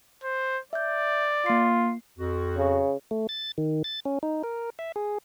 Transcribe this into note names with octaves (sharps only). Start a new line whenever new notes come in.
C5
D5 E5 G6
A#3 F4 C7
F2 F#4
C#3
A3
A6
D#3
A6
C#4
D#4
A#4
E5
G#4